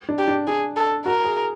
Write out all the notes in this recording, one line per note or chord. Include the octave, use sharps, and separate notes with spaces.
D4
G4
D4
D4 G#4
A4
F#4 A#4
G#4